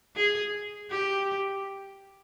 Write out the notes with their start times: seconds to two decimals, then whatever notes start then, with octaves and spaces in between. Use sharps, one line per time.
0.16 G#4
0.90 G4